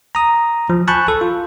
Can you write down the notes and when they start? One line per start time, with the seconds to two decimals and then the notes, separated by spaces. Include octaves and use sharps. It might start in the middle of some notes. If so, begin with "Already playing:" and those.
0.15 A#5 D#6
0.70 F3
0.88 G#5 A5 B5 C#6 F#6 G6
1.08 A4
1.21 F4